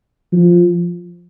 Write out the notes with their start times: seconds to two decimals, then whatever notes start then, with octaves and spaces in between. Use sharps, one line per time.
0.33 F3